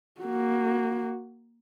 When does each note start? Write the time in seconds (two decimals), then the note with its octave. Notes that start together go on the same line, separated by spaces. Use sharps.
0.21 A#3 F#4